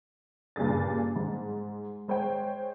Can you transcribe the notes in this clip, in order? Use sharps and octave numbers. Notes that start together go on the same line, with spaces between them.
G2 A#2 C#3 G3 G#4 A6
G#2
G#3 C5 C#5 G5